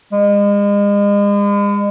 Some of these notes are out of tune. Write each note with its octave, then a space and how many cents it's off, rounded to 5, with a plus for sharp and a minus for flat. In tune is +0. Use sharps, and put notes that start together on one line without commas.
G#3 -40